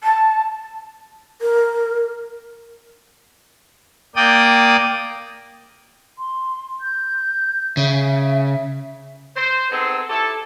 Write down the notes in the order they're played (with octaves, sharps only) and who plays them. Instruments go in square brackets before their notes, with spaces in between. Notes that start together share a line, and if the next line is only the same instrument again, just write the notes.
[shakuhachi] A5
[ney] A#4
[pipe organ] A#3 D5 G5 D#6
[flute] C6
G6
[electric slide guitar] C#3 [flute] E5
[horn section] C5
B3 C4 D#4 G#4 A4
E4 G4 A4